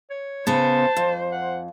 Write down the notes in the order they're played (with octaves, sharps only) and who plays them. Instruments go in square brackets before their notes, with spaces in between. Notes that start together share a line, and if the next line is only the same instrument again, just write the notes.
[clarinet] C#5
[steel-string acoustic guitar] C#3 B3 [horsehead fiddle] C5 [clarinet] A5
[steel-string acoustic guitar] F2
[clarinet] F#5